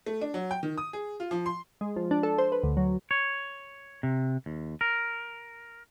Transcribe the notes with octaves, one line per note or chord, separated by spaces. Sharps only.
A3
D4
F#3
G5
D#3
D#6
G#4
F4
F3
C6
G#3
F3
D4
A4
C5
B4
D2
F#3
C#5
C3
D#2
A#4